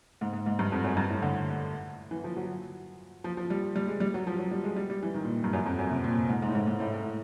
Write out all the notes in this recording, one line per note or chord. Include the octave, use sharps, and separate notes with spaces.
G#2
G#2
G#2
G2
F2
F#2
G2
A2
D3
E3
F3
F#3
F3
F3
G3
G3
G#3
G3
F#3
F3
F#3
G3
G#3
G3
G3
E3
D#3
A#2
G2
F#2
F2
F#2
C3
A#2
G#2
G#2
A2
G#2
G#2
A2
A2